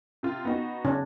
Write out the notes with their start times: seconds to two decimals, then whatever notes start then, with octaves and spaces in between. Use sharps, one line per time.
0.23 C3 F4
0.45 B3 D#4 F#4
0.85 C#3 C#4 D4